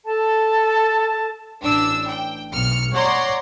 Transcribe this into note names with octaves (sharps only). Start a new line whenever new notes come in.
A4 A5
A1 D4 E6
G5
B1 F6 C#7
C#5 D5 F#5 A#5 C6